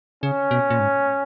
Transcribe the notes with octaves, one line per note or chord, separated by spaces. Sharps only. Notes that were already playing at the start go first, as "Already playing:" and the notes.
C#3 C#4
B2
A#2
G#2